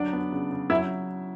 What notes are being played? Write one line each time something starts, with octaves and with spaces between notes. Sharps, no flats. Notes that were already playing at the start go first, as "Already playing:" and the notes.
Already playing: D3 F#3 D4 D5
B3
C#3
C#3
F#3 E4 E5